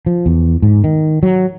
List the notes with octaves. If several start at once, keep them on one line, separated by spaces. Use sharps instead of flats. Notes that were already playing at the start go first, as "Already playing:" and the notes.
F3
E2
G#2
D#3
F#3